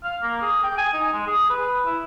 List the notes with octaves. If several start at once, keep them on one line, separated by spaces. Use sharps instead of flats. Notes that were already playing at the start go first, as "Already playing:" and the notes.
F5
A#3
G#4
G5
G#5
D#4
G#3
G#4
B4
E4